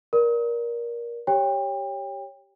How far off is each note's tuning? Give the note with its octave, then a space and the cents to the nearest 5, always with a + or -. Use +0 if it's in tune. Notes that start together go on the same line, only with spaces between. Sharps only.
A#4 +20 D5 -5
G4 +0 C#5 +0 G5 +30